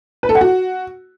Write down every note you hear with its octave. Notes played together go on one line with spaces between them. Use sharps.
B4
A4
F#5
F#4